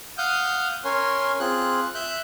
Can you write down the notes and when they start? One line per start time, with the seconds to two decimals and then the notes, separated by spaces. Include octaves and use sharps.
0.18 F5 F#5 D#6 F6 G6
0.85 C#4 A#4 C#5 G#5 C6
1.40 C4 F4 G#4 F#6
1.95 E5 F#6 G6